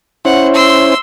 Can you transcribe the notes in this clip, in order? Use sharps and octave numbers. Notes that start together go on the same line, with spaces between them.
C#4 E4 C5 F#5
C6 E6